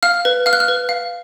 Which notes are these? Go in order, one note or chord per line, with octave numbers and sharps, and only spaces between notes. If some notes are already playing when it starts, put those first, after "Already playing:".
F5 F6
B4
F5 F6
F#6
F6
B4
F5